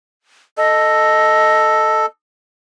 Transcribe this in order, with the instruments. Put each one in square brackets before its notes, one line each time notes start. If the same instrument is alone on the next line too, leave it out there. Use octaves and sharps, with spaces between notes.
[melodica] A4 [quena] D#5